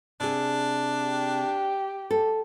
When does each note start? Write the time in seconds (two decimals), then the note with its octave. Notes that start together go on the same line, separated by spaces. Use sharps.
0.20 C3 D4 G#4
1.04 G4
2.11 A4